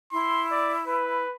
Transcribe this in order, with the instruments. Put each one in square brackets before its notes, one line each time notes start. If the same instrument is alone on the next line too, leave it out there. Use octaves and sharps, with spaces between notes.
[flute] E4 [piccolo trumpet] C6
[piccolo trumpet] D5
B4